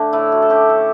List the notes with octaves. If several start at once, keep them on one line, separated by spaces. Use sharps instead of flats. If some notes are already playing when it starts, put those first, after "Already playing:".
Already playing: D3 A3 D4
A2 E4
F#4
A4
C#4 G4
A4